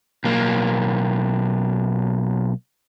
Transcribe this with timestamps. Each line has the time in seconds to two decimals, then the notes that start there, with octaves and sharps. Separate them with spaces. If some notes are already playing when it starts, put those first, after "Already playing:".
0.24 B1 A#3